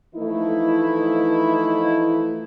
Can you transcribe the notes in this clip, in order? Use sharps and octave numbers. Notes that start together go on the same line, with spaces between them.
E3 F3 A3 D#4 E4